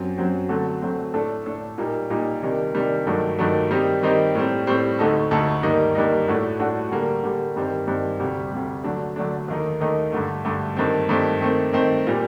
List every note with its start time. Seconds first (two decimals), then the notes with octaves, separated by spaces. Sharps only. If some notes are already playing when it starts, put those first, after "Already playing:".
Already playing: F#2 F#3 C4
0.18 F#2 F#3 C4
0.49 D3 F#3 A3 C4
0.82 D3 F#3 A3 C4
1.14 A2 A3 D4 A4
1.46 A2 A3 D4 A4
1.78 A#2 G3 A#3 D#4
2.10 A#2 G3 A#3 D#4
2.42 C3 D#3 G3 D4
2.74 C3 D#3 G3 D4
3.07 G2 D#3 F#3 A3
3.39 G2 D#3 F#3 A3
3.71 D#3 G3 C4 D#4 G4
4.03 D#3 G3 C4 D#4 G4
4.35 A2 G3 C4
4.67 A2 G3 C4
4.99 D2 D3 A3 D#4 A4
5.31 D2 D3 A3 D#4 A4
5.63 G2 D#3 G3 A#3 D#4
5.95 G2 D#3 G3 A#3 D#4
6.28 A2 A3 D4 F#4
6.59 A2 A3 D4 F#4
6.92 D3 G3 A#3
7.23 D3 G3 A#3
7.56 G2 D#3 G3 C4
7.87 G2 D#3 G3 C4
8.20 D2 C3 G3
8.52 D2 C3 G3
8.84 D3 F#3 A3 D4
9.16 D3 F#3 A3 D4
9.48 D#2 D#3 A3 D#4
9.81 D#2 D#3 A3 D#4
10.12 G2 D3 A3
10.45 G2 D3 A3
10.77 G2 D#3 A3 C4
11.09 G2 D#3 A3 C4
11.41 D#3 A3 C4
11.73 D#3 A3 C4
12.07 A#2 G3